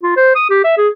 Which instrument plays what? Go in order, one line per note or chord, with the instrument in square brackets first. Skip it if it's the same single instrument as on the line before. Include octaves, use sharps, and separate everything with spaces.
[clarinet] F4
C5
D#6
G4
E5
G#4